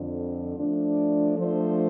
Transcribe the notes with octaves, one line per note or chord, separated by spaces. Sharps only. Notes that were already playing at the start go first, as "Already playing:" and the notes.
Already playing: F2 D3 F3
F3 A3 D4
F3 A3 D4 A4 C5